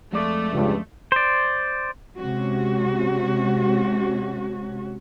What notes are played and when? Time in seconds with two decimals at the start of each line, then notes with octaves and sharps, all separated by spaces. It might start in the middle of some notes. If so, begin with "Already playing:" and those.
0.12 F2 G#3 A3 D5
0.52 C#2 G2
1.12 C5 D5
2.19 C3 G#3 C#4 F#4